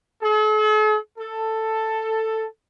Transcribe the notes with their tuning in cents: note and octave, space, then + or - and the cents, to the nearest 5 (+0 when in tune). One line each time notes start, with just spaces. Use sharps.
A4 -45
A4 +10